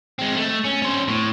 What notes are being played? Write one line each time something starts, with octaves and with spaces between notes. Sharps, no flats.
G#3 C4
A3
C#4
C#4 C5
A2